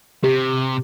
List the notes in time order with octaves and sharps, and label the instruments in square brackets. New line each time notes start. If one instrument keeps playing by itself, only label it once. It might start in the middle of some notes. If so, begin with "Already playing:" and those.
[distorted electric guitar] C3 [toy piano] G4